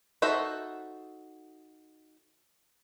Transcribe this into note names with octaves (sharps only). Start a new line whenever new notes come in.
D#4 F#4 A4 C5 E5